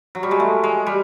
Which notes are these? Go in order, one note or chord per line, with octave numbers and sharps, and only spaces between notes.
F#3
G3
G#3
A3
G#3
G3